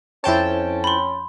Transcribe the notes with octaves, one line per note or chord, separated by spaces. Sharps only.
F2 C#4 E4 C5 C#5 G5 A5
B5 C6